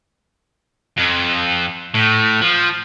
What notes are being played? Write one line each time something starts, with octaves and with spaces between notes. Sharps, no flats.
F2
A2
F3